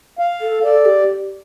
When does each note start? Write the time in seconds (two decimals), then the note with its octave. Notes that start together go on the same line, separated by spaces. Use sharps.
0.19 F5
0.41 A4
0.63 A4 D5
0.85 G4